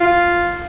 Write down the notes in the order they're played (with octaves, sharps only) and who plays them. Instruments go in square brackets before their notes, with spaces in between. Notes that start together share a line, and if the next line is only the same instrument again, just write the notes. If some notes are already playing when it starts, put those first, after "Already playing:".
[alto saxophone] F4